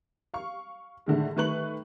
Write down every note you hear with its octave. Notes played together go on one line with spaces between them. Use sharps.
F5 C#6
A2 D3 D#3 G#3
D#3 A3 B4 C#6 F#6 F#7